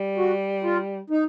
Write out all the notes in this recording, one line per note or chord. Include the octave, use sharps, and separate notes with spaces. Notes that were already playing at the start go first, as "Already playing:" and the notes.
Already playing: G3
F#4
F4
D#4